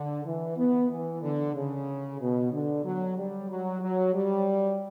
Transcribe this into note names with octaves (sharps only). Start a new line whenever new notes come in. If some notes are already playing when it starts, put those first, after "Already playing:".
Already playing: D3
E3
B3
E3
D3
C#3
B2
D3
F#3
G3
F#3
F#3
G3